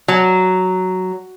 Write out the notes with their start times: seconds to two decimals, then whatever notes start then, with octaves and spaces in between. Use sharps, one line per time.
0.08 F#3